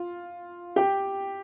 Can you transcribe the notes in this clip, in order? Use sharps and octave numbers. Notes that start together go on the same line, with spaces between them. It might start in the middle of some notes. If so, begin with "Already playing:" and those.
Already playing: F4
G4 G5